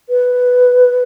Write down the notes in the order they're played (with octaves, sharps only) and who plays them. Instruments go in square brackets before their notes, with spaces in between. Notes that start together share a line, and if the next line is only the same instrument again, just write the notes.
[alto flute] B4